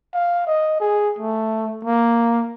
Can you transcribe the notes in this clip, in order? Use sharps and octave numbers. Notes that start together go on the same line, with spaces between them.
F5
D#5
G#4
A3
A#3